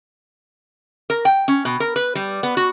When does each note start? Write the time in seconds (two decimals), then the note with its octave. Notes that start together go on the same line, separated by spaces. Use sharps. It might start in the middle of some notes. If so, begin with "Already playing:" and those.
1.10 A#4
1.25 G5
1.48 C#4
1.65 B2
1.80 A#4
1.96 B4
2.15 G3
2.43 B3
2.57 F#4